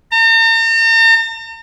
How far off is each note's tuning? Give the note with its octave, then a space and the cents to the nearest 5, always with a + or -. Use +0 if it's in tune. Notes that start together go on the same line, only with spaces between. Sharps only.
A#5 -45